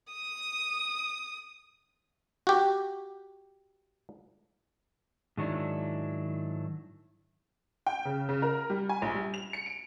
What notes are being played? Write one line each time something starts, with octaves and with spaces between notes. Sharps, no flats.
D#6
F#4 G4
G#2 D#3 F#3 D4 E4
G5
C#3
C#3
A#4
G3
G#5
A#1
G3
F7
C#7
D7